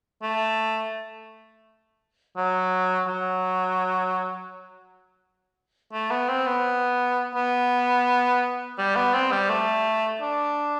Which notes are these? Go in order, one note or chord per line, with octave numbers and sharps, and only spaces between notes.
A3
F#3
F#3
A3
B3
C4
B3
B3
G3
B3
C4
G3
A3
D4